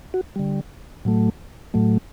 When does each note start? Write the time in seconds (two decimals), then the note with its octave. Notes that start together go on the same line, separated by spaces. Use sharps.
0.14 F#4
0.36 D3 G3
1.05 A2 F#3 A3
1.74 A2 F#3 A3